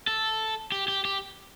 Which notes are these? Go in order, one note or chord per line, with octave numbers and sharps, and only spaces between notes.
A4
G4
G4
G4